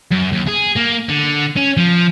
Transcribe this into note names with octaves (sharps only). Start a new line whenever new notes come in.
F#2
D#2
G#4
A#3
D3
C#4
F3